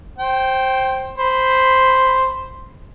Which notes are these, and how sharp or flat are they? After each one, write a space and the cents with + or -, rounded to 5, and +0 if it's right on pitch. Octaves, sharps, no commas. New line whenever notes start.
C5 +15 G5 -10
C5 +0 B5 +0